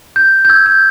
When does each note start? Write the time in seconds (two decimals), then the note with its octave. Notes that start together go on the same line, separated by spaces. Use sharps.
0.16 G6
0.45 G6
0.49 E6 G#6
0.66 G6